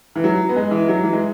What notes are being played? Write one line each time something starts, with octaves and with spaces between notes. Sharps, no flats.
E3
F#3
B3
G#3
E3
F#3
E3
G#3